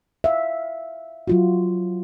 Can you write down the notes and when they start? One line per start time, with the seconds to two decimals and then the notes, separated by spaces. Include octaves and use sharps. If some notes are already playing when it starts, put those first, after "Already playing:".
0.24 E5 F5
1.28 F#3 F4 F#4